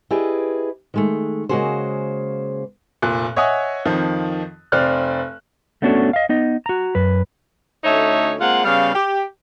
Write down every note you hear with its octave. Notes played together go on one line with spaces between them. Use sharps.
E4 G4 G#4 B4 D5 D#5
D#3 G#3 A3
C#3 G#3 A#3 F#4 G#4 C5
F1 A#2 F#6
C#5 D#5 E5 F#5 G#5 D#6
F2 D#3 F3
F1 C4 D5 F6 F#6
A3 B3 C#4 D4 F#4 A4
D#5 F5
B3 D#4 D#5
F#4 A#5
F#2 B4
D2 A3 C#4 D#4 C#5 E5
G#3 A#3 C4 F4 F#5
C#3 G3 B3 F5
G4